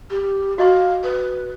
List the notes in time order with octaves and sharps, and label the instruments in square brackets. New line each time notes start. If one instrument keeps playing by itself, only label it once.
[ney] G4
[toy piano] F#4 D#5 C#6 [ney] F5
[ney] B4